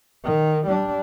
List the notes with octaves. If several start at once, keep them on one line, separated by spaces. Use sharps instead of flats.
D#3
G3 D4